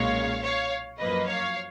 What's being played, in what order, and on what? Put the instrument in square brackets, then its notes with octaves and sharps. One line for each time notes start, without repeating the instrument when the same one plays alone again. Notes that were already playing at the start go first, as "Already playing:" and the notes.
Already playing: [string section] B1 A#2 G#3 C#4 C#5 F5
C#5 F5
F#2 F3 A#3 B4 D#5
C#5 F5